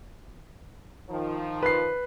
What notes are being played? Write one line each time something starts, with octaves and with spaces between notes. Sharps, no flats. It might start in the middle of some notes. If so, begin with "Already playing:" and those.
D#3 F3
B4 C7